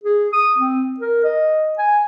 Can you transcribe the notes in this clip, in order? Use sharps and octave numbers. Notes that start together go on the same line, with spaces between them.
G#4
D#6
C4
A#4
D#5
G#5